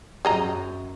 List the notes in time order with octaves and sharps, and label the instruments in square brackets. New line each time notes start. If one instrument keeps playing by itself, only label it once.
[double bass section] F#2 [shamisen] G#4 D#5 A#5